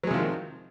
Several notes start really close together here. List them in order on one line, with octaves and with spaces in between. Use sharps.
F#3 G#3 C3 F3 D#3